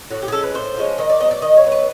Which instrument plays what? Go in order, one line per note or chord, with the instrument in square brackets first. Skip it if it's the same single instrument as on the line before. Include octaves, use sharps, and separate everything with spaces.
[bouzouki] A2 F#4
G4
G#4
F3 G#3 C#4 A4
B4
A2 C5
F3 G#3 C#4
D#3 D#5
D5
F#3 B3 D#5
D5
D#3 D#5
C#5
F#3 B3
B4